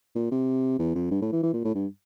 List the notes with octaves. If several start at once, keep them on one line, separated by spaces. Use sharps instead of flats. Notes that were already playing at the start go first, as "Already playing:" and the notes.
A#2
C3
E2
F2
G2
A2
E3
E3
A#2
A2
G2